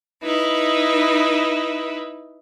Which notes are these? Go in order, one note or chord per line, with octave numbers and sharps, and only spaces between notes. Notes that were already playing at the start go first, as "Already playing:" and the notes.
D#4 E4 B4